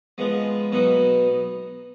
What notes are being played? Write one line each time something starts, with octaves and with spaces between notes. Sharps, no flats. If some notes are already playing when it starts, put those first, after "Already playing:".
F3 G#3 B3
B2 F#3 B3 D#4